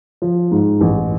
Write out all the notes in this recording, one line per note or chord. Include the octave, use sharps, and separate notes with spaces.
F3
G#2
A1